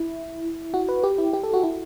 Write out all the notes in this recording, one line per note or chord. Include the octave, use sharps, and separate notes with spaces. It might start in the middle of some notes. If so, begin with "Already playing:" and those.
Already playing: E4
F#4
B4
G4
E4
G4
A4
F#4
E4